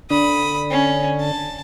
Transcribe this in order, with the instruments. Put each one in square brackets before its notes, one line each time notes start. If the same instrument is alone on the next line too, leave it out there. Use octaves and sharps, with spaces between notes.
[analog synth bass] D3 [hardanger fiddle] B5 D#6
[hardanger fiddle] C#4
A5